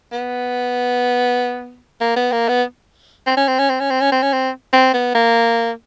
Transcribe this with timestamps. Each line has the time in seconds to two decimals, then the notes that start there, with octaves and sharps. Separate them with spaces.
0.13 B3
2.01 A#3
2.16 B3
2.32 A#3
2.48 B3
3.26 C4
3.37 C#4
3.48 C4
3.59 C#4
3.69 C4
3.80 C#4
3.90 C4
4.01 C#4
4.12 C4
4.22 C#4
4.32 C4
4.73 C4
4.93 B3
5.15 A#3